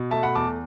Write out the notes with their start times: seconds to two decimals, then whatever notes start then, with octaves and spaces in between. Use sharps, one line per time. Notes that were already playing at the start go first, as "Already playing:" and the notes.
Already playing: B2
0.11 A3 E5 A5
0.23 F#5 B5
0.35 E2 A5 D6